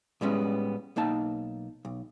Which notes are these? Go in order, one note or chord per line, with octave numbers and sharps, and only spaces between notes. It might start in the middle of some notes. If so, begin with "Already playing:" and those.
A2 G3 G#3 B3 C#4
B1 A#3 D#4 A5
B1